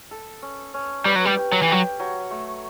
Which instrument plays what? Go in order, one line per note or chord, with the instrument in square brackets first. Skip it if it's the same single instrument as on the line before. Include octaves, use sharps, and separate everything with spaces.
[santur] A4
C#4
C#4
[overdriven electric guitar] G3 [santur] B4
[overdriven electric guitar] F#3
G3
[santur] G4
[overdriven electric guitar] F#3
E3
[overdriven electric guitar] F#3 [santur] G4
[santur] F#3
A3